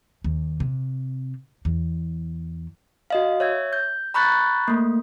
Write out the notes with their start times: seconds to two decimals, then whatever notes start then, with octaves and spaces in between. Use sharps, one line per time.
0.24 D#2
0.60 C3
1.65 E2
3.10 F#4 D#5 F5
3.40 C#5 E5 G#6
3.73 G6
4.14 A#5 B5 C#6 F#6 G6 A6
4.68 A3 A#3